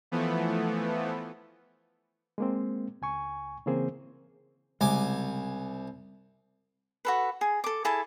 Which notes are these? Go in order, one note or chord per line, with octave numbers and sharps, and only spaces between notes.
E3 F3 A3 B3
G#3 A#3 C4
C#2 G#5 C#6
C#3 E3 A#3 C4 G#4 C5
C2 C#3 G#3 G#5 D6
F#4 A4 B4
G#4
A4 D6
E4 G#4 A4 A5